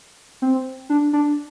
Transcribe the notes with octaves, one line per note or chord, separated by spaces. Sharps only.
C4
D4
D4